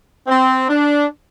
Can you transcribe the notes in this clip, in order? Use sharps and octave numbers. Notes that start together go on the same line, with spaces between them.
C4
D4